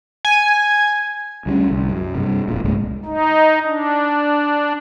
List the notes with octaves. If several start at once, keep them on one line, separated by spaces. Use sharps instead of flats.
G#5
D2 G3 B3 C#4
C2
F#2
G2 C3
F1 A#2
C#2 G#2 G#3 A3
D#4
D4